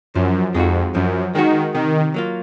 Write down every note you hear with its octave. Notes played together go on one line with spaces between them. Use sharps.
F#2 F3
F2 G#3 D#4 F#4
F#2 F3
D#3 G#3 D#4 F#4
C3 D#3
F#3 A#3 F4